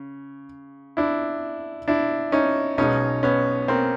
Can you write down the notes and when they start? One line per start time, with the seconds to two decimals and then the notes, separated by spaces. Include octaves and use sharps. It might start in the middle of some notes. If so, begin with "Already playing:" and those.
Already playing: C#3
0.97 D4 E4
1.88 D4 E4
2.32 C#4 D#4
2.78 B1 B2 G#3 C#4 D#4
3.23 B3 C#4
3.68 A#3 C4